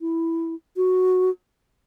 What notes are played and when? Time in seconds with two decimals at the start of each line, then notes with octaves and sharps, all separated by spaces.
0.01 E4
0.77 F#4